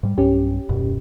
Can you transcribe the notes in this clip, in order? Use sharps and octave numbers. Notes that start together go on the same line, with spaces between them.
G#2 G3
B1 G2 C#4 G4
D#1 F#2 B2